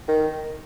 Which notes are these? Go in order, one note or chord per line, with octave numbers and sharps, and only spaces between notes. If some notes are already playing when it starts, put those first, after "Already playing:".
D#3